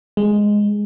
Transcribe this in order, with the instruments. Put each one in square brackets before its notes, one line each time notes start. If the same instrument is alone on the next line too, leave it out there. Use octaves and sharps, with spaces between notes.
[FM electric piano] G#3